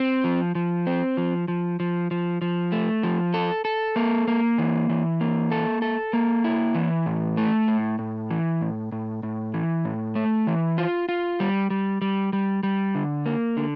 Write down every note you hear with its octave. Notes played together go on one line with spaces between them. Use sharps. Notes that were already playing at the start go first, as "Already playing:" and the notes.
Already playing: C4
F3
F3
C4
F3
F3
F3
F3
F3
A3
F3
A4
A4
A#3
A#3
E3
E3
A#3
A4
A4
A#3
E4
E3
A2
A3
A2
A2
E3
A2
A2
A2
E3
A2
A3
E3
F4
F4
G3
G3
G3
G3
G3
D3
A#3
D3